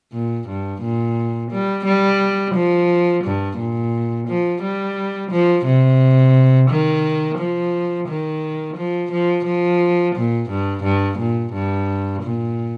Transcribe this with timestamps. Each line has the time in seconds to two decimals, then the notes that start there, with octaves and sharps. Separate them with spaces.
0.13 A#2
0.48 G2
0.81 A#2
1.51 G3
1.85 G3
2.55 F3
3.24 G2
3.58 A#2
4.27 F3
4.62 G3
5.31 F3
5.66 C3
6.69 D#3
7.38 F3
8.08 D#3
8.76 F3
9.12 F3
9.46 F3
10.15 A#2
10.50 G2
10.83 G2
11.18 A#2
11.53 G2
12.22 A#2